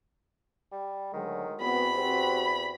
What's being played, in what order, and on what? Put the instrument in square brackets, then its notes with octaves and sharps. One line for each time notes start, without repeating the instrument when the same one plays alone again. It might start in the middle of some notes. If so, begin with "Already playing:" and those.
[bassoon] G3
[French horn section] D2 F#3 G#3 [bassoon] D#3
[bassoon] E2 [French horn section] B3 C4 F#4 [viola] B5
[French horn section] C4 F#4 G4